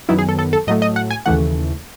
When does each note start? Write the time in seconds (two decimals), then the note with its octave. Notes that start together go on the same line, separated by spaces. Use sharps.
0.09 F#2 D#3 F#3 B3 E4
0.18 G#4
0.29 A4
0.39 A4
0.53 A4
0.67 A2 F#3 A3 D#5
0.82 D#5
0.96 F#5
1.11 G#5
1.26 D#2 C#3 E3 A3 F#5